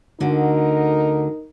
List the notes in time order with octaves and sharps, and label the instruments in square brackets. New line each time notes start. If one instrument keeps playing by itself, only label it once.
[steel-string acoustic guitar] D2 D3 F#4 [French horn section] D#4 A#4